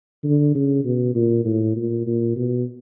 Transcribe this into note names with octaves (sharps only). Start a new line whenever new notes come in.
D3
C#3
B2
A#2
A2
A#2
A#2
B2